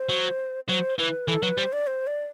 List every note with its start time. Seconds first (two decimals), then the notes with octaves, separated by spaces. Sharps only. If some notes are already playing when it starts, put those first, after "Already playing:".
Already playing: C5
0.09 F#3
0.68 F#3 C5
0.98 E3 B4
1.27 E3 A4
1.42 F#3 B4
1.58 G3 C5
1.73 D5
1.87 C5
2.07 D5